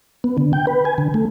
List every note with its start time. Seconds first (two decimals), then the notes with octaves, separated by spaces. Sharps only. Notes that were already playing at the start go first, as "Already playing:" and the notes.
0.24 B3
0.38 D3
0.53 G5
0.67 B4
0.85 G#5
0.98 D3
1.14 A3